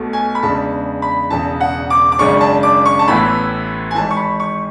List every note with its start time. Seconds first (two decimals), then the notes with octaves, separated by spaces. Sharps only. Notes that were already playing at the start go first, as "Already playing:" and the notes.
Already playing: B1 B2 A3
0.13 G#5
0.35 B5
0.43 E2 C#3 E3 G#3 D4 A5
1.02 B5
1.30 E1 E2 C#3 E3 A5
1.60 F#5
1.90 D6
2.12 D6
2.19 G#1 F#2 C#3 G#3 D4 C#6
2.41 A5
2.63 D6
2.86 C#6
2.99 A5
3.07 A1 A2 E3 B3 E4 B5
3.91 G#5
3.95 G#1 G#2 E3 A5
4.11 C#6
4.17 B5
4.40 C#6